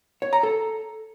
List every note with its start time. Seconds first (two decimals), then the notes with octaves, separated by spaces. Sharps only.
0.22 C#5
0.33 A#5
0.43 A4